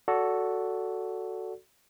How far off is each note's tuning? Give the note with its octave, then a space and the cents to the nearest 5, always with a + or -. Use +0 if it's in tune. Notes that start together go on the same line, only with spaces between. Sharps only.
F#4 +0 A4 +0 D5 -25